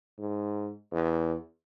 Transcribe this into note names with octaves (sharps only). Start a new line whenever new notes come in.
G#2
E2